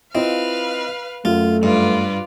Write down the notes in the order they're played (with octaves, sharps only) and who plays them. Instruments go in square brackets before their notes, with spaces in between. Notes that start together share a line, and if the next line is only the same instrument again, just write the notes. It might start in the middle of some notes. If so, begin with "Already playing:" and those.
[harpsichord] C4 [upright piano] E4 F4 D#5 [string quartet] B4 F5
[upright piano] F#2 [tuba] A3 [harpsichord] F4
[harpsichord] G2 [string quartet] F4 B4 D5